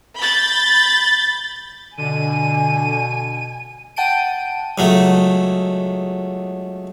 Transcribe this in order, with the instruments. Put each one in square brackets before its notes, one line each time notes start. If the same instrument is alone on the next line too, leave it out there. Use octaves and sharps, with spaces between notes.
[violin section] B5 G6 A6
[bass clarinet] B2 [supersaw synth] D3 [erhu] G#5 [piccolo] D#7
[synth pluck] F#5 G5 A5 G6 D7 D#7
[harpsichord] C#2 F#3 A3